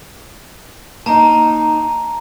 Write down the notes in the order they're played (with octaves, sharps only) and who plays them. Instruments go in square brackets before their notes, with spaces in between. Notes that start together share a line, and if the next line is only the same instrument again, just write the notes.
[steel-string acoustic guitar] A#3 D#4 [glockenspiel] A5 A#5